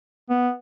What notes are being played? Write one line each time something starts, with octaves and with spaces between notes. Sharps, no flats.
B3